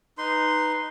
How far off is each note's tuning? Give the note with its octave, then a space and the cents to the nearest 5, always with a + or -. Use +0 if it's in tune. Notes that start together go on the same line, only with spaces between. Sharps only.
D#4 +0 B4 +0 C6 -5